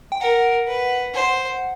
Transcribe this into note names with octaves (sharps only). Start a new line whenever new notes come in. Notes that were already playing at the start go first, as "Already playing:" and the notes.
G5
A#4 F#5
B4
C5